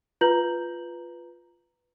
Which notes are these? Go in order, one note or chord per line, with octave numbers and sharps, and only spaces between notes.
F4 B4 A#5 G6 F#7